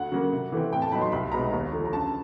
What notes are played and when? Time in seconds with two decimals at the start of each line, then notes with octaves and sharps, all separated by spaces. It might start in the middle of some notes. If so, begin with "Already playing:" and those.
Already playing: D2 F#5
0.12 C#3 F#3 A#3
0.32 C3
0.52 E3 A3 C4
0.72 A2 G5
0.82 A5
0.92 F#3 B3 D#4 B5
1.02 C6
1.12 C2 B5
1.32 B2 G#3 B3 D#4 A#5
1.52 D#2
1.72 D3 F3 A3
1.85 A#5
1.93 C#3 A5